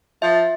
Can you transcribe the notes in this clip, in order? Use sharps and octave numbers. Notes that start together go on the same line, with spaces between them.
F3 E5